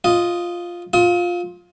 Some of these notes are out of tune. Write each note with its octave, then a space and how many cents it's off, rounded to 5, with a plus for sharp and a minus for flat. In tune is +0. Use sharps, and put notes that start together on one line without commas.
F4 +0 D#5 +0
F4 +10 D#6 +40